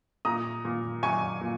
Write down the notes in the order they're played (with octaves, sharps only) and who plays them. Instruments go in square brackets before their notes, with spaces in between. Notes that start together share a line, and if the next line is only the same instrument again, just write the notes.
[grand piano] A#2 A#5 D#6
A#2
F#3 G#5 C#6
A#2